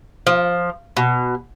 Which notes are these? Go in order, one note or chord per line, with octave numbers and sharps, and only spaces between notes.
F3
B2